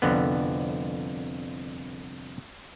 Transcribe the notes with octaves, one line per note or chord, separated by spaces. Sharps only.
C2 F2 D3 B3